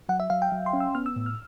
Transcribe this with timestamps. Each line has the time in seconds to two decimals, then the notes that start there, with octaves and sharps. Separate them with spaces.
0.09 F#3 F#5
0.20 E5
0.30 F#3 F5
0.42 G5
0.52 F#3
0.66 C6
0.73 C#4
0.80 E6
0.95 B3 F6
1.06 E6
1.16 A2
1.26 F6